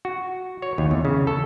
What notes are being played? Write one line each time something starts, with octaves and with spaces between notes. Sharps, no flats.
F#4
C#5
D#2
E2
C#3
A4